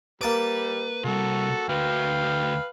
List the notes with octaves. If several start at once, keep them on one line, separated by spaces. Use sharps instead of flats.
G3 A#3 B4 A5 D6
C3 G3 F#4 A4
D2 F#4 B4 F5 G5